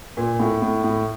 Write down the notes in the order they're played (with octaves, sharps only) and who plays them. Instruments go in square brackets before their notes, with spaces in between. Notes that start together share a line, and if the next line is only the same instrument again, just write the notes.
[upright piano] A#2
A2
A2
A2